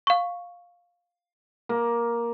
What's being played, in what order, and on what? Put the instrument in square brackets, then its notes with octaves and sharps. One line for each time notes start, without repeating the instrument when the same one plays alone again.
[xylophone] F5 C#6
[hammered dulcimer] A#3